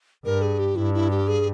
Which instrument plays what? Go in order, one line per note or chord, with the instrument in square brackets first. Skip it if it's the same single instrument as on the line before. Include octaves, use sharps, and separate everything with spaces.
[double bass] G2 [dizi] A#4
[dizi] G#4
G4
[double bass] G2 [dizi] E4
[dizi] E4
G4
G#4